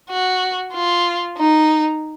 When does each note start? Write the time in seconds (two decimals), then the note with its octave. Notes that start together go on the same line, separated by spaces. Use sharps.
0.10 F#4
0.73 F4
1.37 D#4